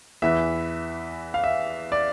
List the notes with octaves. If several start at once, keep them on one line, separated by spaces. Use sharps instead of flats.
E2 E3 E5
F5
E5
D5